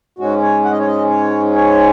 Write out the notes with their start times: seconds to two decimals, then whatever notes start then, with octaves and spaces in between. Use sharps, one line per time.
0.19 G#2 G#3 C#4 F#4
0.42 C#5
0.65 F#5
0.72 D#5
0.79 C#5
0.87 D#5
1.10 C#5
1.56 C#5